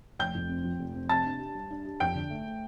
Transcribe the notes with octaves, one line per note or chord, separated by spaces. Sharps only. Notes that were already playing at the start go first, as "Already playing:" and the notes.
F1 G5 G6
F2
C4
F3
F1
C4
C3 A5 A6
D4
G4
G3
D4
G4
F2 G5 G6
D3
A3
A3